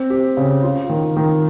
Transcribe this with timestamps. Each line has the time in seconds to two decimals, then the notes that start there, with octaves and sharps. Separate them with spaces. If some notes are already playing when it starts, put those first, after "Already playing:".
Already playing: C4
0.10 G4
0.37 C#3
0.63 F4
0.89 D#3
1.17 D#3